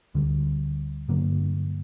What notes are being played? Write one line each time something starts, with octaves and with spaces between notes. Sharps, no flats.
D2 D3 G3
G2 D3 F#3 A#3